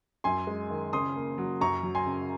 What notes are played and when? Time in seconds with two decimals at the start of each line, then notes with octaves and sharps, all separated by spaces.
0.24 F#2 G#5 C6
0.47 G#3
0.70 D#3
0.93 C#3 C6 D#6
1.16 A#3
1.38 F#3
1.61 F#2 A#5 C#6
1.83 F#3
1.95 G#5 C6
2.06 C#3